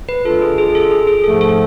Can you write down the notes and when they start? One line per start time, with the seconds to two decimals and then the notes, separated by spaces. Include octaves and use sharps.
0.09 B4
0.25 C#3 G#3 D4 F4 A4
0.42 G#4
0.58 G#4
0.75 A4
0.91 G#4
1.07 G#4
1.24 G#2 F3 A3 A4
1.41 A4